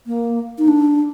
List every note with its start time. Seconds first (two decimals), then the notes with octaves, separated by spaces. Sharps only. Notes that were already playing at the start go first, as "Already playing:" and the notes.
0.07 A#3
0.58 D#4
0.68 D4